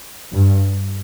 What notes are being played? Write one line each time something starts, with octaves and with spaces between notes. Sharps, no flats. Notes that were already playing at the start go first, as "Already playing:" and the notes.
G2